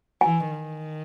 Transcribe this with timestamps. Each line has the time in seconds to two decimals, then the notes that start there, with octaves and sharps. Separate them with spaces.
0.21 E3 G#5
0.51 D#3